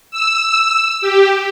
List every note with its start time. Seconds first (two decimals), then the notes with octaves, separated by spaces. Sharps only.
0.11 E6
1.01 G4